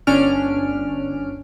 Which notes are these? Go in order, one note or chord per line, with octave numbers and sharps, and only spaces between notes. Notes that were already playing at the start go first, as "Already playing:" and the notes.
G1 C#4 D4 F6 D7